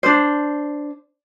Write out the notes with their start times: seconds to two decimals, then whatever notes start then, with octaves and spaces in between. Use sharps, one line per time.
0.03 D4 C5